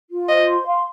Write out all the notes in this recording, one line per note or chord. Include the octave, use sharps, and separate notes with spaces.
F4
C5 D#5
C6
F5